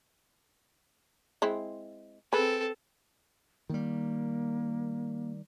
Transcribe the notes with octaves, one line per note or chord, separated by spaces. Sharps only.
G#3 C4 E4
C4 G#4 A4 B4
D#3 G3 A#3